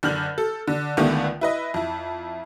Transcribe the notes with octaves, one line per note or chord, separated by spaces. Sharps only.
F#1 D3 F6 G6 F#7
A4
D3
C#2 D3 D#3 A3 B3
E4 B4 D#5
F2 E4